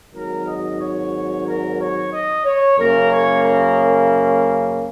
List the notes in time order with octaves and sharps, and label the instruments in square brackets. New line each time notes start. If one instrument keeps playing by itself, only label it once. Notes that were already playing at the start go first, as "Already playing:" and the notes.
[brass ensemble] G#1 G#2 F#3 A#4
D#5
C#5
A#4
C#5
D#5
C#5
F#2 C#3 A#3 A#4
C#5
A#4